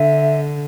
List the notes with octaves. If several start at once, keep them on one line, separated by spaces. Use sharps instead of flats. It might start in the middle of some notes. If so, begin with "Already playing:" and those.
Already playing: D3 E5